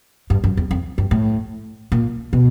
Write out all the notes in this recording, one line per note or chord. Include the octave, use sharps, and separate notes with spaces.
G2
F#2
E2
F2
G2
A2
A#2
B2